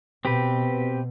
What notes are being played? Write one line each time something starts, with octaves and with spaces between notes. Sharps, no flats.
B2 C4 G4 B4